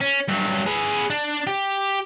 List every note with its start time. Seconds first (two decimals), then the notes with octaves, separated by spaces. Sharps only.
0.01 C#4
0.28 G2 F#3
0.66 G#4 B4
1.10 D4
1.47 G4